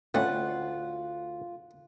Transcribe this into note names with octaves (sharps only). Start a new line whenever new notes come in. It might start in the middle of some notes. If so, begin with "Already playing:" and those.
D2 A3 C4 C#4 E4 F4 F#5